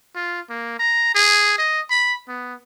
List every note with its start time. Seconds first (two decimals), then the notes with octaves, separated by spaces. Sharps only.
0.16 F4
0.49 A#3
0.79 A#5
1.15 G#4
1.58 D#5
1.90 B5
2.28 B3